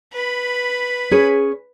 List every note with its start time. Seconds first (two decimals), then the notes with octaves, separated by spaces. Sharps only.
0.13 B4 B5
1.11 C#4 G#4 C#5